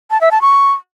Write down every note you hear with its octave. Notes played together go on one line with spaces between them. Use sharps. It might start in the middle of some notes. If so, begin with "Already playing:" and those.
A5
E5
A5
C#6